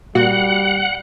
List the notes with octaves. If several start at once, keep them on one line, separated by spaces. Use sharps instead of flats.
A#2 G3 F#4 F#5